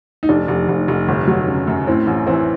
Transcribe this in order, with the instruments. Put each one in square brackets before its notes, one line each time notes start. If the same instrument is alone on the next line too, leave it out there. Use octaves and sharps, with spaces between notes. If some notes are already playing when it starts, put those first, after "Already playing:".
[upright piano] D#4
F1 D4
F1
F1
F1
G1
F#3
C#3
F#2
A2 C4
A1
E3 C4